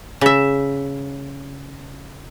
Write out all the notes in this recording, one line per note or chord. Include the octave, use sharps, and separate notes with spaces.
C#3 E5